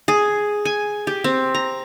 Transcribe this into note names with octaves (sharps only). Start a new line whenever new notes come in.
G#4
G#5
G4
C4
A#5